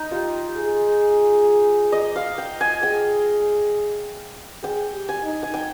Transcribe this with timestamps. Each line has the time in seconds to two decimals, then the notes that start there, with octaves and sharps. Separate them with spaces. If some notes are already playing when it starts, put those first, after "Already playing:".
Already playing: D#4
0.11 F4 G4
0.57 G#4
1.92 D#5
2.16 F5
2.38 G5
2.61 G#5
2.83 G#4 G5
4.63 G#4 G5
4.93 G4
5.09 G#5
5.24 D#4
5.43 G#5
5.54 G5